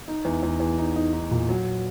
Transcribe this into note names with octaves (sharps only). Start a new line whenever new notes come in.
D#4
E2
E2
E2
D#4
D#4
D#4
A#2
F#3